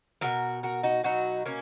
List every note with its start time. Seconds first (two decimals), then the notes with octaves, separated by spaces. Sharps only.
0.21 B2 F#3 F#4 A#4
0.63 F#4 A#4
0.83 D#4 F#4
1.04 B2 F#3 D#4 F#4
1.46 A#3 C#4